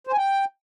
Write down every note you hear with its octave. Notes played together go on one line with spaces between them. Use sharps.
C5
G#5
G5